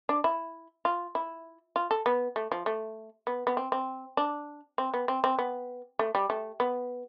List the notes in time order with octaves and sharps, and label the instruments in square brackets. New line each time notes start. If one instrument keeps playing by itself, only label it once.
[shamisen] D4
E4
F4
E4
F4
A4
B3
A3
F3
A3
B3
B3
C4
C4
D4
C4
B3
C4
C4
B3
A3
G3
A3
B3